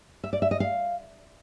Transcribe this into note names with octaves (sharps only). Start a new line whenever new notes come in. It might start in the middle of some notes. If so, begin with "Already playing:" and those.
E5
D5
E5
D#5
F5